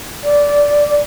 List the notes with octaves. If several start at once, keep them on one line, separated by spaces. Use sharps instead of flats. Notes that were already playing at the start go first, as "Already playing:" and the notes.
D5